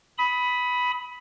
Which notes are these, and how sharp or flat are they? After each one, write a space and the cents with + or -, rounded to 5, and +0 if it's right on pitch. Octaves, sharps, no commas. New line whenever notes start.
B5 +0 D#6 +30